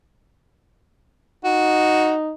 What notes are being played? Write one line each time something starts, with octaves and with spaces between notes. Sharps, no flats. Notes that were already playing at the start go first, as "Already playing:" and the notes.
D#4 F#4